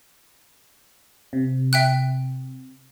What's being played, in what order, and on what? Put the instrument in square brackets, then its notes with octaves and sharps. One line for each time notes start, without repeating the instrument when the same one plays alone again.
[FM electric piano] C3
[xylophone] E5 G5 F#6